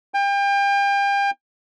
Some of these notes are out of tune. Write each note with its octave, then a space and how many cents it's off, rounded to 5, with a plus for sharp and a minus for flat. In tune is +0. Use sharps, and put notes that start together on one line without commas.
G5 +35